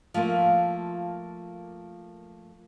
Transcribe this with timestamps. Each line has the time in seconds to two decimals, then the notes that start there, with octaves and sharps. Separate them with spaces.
0.14 F3 A3 A#3 F4